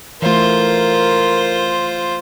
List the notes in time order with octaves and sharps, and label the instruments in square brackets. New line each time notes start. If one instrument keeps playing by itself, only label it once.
[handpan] E3 A3 [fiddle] F4 C5 [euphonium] A#4